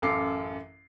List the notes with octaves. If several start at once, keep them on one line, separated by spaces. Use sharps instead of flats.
A1 F#2 A4 F5 D6 C7